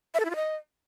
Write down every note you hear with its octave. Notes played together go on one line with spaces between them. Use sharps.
E5
A4
E4
F4
D#5